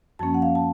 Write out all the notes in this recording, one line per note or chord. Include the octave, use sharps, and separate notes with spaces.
F#2 F3 A#3 C#4 A5
F#5
F5
A5